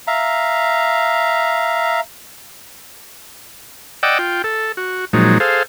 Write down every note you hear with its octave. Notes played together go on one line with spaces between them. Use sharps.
E5 F5 A#5
D5 D#5 F#5 G5 D6 E6
F4 G5
A4
F#4
A#2 F3 F#3 G#3 D#4
G#4 A4 C5 F5